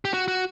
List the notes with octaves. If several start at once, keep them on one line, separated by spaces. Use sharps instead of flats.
G4
F#4
F#4